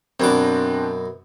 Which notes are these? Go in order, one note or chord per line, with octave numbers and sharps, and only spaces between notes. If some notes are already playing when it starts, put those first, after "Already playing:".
F#2 B2 C4 D4 D6